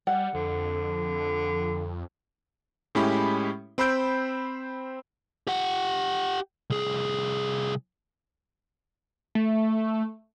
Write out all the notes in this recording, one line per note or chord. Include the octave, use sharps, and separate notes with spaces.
G3 F#5
F2 D3
A2 G#3 C#4 E4 G4 B5
C4 C5 B5 E6 G6 D7
G4 F#5
C2 G#4
A3